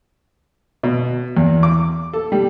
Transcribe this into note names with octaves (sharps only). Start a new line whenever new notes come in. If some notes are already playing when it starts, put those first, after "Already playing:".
B2
E2
D6
A4
G3